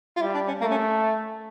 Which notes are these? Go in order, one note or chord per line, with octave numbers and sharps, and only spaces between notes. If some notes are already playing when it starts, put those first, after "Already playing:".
F4
G3 E4
D4
C#4
A3 A#3
C#4